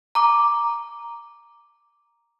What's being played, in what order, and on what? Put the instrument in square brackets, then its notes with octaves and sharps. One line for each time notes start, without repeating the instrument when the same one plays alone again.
[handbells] A#5 D6